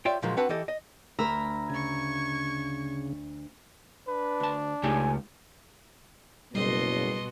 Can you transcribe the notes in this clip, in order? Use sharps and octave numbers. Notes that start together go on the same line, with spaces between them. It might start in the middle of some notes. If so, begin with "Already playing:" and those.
F4 G4 C#5 D5 E5 G5
A#2 D3 F3 F#3 G#3 A#3
C4 D4 F#4 B4 F#5 A5
E3 E4 G4 A4 D#5
D#5
D2 A#4 A#5 B5 E6
C#3 C#6 G#6
D4 B4
D2 A5
C#2 A3 D#4 G4 G#5
F#1 B2 G3 F#4 D#5 C6 C7